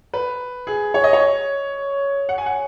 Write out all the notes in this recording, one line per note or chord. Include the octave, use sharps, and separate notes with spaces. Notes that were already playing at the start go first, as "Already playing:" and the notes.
B4
G#4
C#5
D#5
C#5
F#5
G#5
F#5